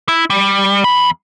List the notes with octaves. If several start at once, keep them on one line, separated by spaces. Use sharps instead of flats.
E4
G3
E2 B5